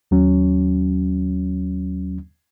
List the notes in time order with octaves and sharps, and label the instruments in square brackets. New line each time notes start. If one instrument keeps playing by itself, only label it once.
[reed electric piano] D#2 F#3 C#4